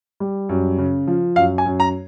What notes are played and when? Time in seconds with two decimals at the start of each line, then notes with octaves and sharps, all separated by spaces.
0.20 G3
0.49 F#2
0.78 C#3
1.07 F3
1.36 F#2 F5
1.58 G#5
1.66 F#2
1.80 A#5